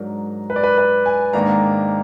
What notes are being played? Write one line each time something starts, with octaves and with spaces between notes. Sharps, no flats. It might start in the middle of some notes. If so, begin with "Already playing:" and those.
Already playing: G#2 F#3 D4 A#4
B4
D5
B4
B4
G#5
G#2 D#3 A#3 D4 A#5